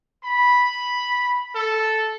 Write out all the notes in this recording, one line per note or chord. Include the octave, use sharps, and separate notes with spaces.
B5
A4